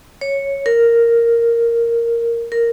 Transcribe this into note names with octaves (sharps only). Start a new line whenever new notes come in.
C#5
A#4
A#4